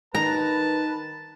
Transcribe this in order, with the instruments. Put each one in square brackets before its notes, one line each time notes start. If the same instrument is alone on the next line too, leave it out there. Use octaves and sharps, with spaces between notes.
[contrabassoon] D#3 [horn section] B4 [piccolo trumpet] A5 [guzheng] A#5